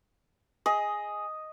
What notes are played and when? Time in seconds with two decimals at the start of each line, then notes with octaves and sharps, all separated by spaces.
0.66 G#4 D#5